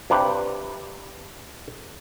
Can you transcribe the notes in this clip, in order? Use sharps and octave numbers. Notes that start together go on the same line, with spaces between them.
G2 C3 G4 B4